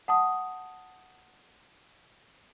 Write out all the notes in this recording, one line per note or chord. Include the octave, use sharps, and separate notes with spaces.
F#5 A5 D#6